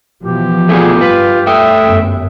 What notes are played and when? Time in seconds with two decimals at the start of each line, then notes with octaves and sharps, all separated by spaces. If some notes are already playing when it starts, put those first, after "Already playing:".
0.23 B2 E3 F3 G4
0.69 A3 B3 F4 G#4
1.01 G2 F4 B4
1.47 A3 E5 G5 D#6
1.83 G1 F#2